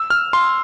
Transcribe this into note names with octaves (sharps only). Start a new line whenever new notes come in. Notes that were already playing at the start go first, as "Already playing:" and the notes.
Already playing: E6
F6
C6